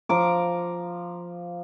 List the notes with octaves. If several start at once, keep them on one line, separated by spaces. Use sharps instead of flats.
F3 A#5 D6